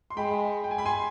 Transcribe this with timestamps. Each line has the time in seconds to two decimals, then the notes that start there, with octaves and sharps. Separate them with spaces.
0.10 C6
0.17 G#3 G5 B5
0.64 G5
0.71 G#5
0.78 B5
0.86 G#5 C6